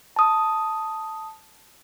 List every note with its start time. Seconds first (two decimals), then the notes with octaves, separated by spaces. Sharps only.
0.16 A5 D#6